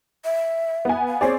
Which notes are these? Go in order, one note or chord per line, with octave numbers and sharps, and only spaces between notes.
E5
B3 G#5
F5
C4 G#4 C#5 D5